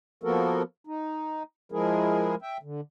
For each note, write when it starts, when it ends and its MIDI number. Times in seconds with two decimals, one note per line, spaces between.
0.23 0.62 53
0.23 0.62 58
0.23 0.62 59
0.23 0.62 66
0.23 0.62 69
0.23 0.62 70
0.87 1.43 63
1.72 2.35 53
1.72 2.35 56
1.72 2.35 64
1.72 2.35 68
1.72 2.35 70
2.42 2.57 76
2.42 2.57 79
2.63 2.81 50